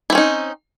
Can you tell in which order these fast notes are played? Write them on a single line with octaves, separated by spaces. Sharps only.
E4 C4 C#4 D#4